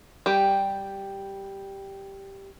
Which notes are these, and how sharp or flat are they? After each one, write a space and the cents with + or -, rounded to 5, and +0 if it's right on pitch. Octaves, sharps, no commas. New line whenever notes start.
G3 +0 G4 +0